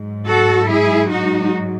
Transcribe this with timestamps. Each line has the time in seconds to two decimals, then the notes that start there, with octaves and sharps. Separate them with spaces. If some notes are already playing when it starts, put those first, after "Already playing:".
Already playing: G#2 F#3
0.27 F#4 A4
0.69 E4 G#4
1.10 D#4 F#4